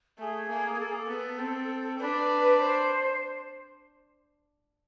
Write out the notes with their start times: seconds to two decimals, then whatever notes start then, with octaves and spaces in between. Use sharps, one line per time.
0.18 A3 G#4
0.49 A#3
0.78 A#3 A4
0.87 G#4
0.96 A4
1.09 B3
1.39 C4
1.99 D4 B4
2.59 C5